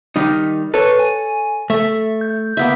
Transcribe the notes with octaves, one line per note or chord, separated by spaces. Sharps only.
D#3 G3 D#4
A4 B4 C#5
G#5
A3 E5
G6
A#3 B3 E5